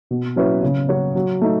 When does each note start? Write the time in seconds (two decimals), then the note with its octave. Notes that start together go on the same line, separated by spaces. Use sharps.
0.11 B2
0.36 F#3 C#4 E4 B4
0.63 C#3
0.89 F#3 C#4 F#4 C#5
1.15 F#3
1.42 A3 D#4